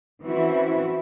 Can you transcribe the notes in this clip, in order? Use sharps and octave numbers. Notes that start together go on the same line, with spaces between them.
E3 C4 C#4 E4 F#4